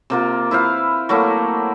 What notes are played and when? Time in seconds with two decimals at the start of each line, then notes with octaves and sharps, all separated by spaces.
0.10 C3 A#3 F4
0.51 E4 B4 C5 F5
1.09 F#3 A3 A#3 E4